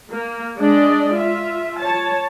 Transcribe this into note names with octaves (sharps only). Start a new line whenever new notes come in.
A#3
G#3 D4 D5 D#5
F4 E5
C#5 A5